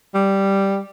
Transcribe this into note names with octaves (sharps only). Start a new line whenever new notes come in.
G3